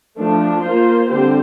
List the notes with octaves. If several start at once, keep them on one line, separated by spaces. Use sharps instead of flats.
F3 A3 D4
A#3 F4 C5
D3 G3 C4 G4 C5